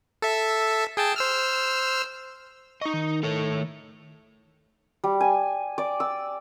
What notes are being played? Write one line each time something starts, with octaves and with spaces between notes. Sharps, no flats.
A4 E5
G#4 G5 A5
C5 E6 F6
D#4 D#5 C#6
D#3
A3 A4 C#5
G3
G#5
D5
E6